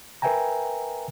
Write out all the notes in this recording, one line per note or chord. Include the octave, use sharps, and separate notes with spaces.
A#4 B4 E5 G5 G#5 A#5